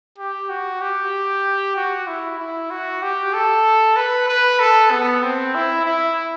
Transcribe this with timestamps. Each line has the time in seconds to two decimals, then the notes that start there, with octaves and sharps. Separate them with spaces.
0.19 G4
0.50 F#4
0.82 G4
1.76 F#4
2.07 E4
2.39 E4
2.71 F#4
3.02 G4
3.34 A4
3.97 B4
4.28 B4
4.60 A4
4.91 B3
5.23 C4
5.55 E4
5.86 E4